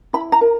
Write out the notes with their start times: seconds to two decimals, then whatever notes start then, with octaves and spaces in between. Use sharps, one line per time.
0.13 E4 B5
0.32 A#5
0.41 A#4